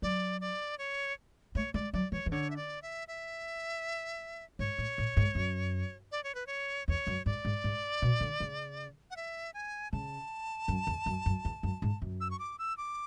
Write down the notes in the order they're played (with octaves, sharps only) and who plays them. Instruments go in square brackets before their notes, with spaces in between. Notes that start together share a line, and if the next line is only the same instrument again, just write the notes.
[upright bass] F#3 [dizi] D5
[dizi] D5
C#5
[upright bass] A3 [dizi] C#5
[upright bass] G#3 [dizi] D5
[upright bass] F#3 [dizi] D5
[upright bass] E3 [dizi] C#5
[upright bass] E3
[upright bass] D3 [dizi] C#5
[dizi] E5
D5
E5
E5
[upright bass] G#2 [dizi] C#5
[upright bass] A2
A2
G#2
F#2
[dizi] D5
C#5
B4
C#5
[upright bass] E2 [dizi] C#5
[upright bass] F#2
[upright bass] G#2 [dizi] D5
[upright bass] G#2
G#2
B2
D3
C#3
[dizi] F#5
E5
G#5
[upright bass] C#3 [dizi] A5
[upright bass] F#2
E2
F#2
F#2
E2
F#2
G#2
F#2
[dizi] E6
C#6
D6
E6
D6